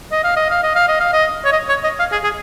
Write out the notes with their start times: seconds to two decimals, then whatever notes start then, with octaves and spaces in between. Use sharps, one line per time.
0.12 D#5
0.24 F5
0.36 D#5
0.50 F5
0.63 D#5
0.75 F5
0.88 D#5
1.00 F5
1.13 D#5
1.45 C#5
1.52 D#5
1.69 C#5
1.84 D#5
1.99 F5
2.12 G#4
2.23 G#4